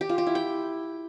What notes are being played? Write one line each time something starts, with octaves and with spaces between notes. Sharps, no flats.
G4
F4
G4
E4
G5